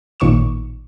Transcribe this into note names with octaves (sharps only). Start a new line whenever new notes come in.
A1 A#2 D#3 C#6 D6 E7